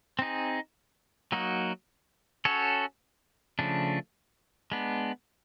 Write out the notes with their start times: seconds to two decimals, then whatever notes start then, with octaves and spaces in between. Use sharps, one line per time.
0.19 C4 D#4 G#4
1.32 F#3 A#3 D#4 F#4
2.45 C#4 F#4 A4 C#5
3.59 C#3 F3 A3 D4
4.72 G#3 B3 D4